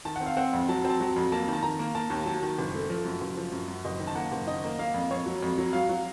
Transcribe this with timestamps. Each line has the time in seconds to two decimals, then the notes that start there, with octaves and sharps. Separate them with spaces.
0.05 D#3 A5
0.16 C4 F#5
0.26 F5
0.37 C4 F#5
0.53 F2
0.69 F#3 A5
0.84 C4
0.90 A5
1.00 F#3
1.16 F2
1.32 A#3 A5
1.48 D#3
1.53 A5
1.63 D#3 A#5
1.79 A#3
1.95 A#3 A5
2.10 D#2
2.26 F#3 A5
2.43 D#3
2.58 F#1
2.74 A3
2.90 F3
3.05 F#2
3.21 F#1
3.37 F3
3.52 F#2
3.68 F#2
3.85 F#1 D#5
4.00 D#3
4.07 A5
4.15 A#3 F#5
4.32 F#1
4.47 D#3 D#5
4.64 A#3
4.79 A#3 F5
4.94 F2
5.11 F2 C#5
5.26 F#3
5.43 F2
5.58 F#3
5.73 F#3 F5
5.89 F#3